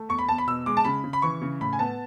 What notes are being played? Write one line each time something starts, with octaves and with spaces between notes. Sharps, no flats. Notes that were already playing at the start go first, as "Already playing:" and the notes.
Already playing: A3
E2 C#6
B5
E2 A5
B5
B2 E6
G#3 D6
A5
C#3 B5
C#3
B5
E3 C#6
C#3
A2 B5
G#5
B3 A5